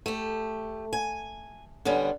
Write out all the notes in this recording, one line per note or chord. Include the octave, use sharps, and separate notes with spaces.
A3 G4
G#5
D3 G3 B3 C#4